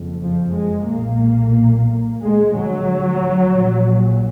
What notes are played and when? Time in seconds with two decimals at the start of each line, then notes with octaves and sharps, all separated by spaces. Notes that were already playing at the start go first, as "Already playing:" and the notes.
Already playing: F#1 F2
0.21 F3
0.55 G#3
0.89 B1 A#2 A#3
2.23 D2 G#3
2.56 F#3
3.57 A#1 A#2